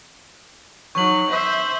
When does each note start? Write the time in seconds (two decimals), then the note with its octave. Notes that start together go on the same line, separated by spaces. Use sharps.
0.95 F#3 D#4 C#6 F#7
1.30 C5 E5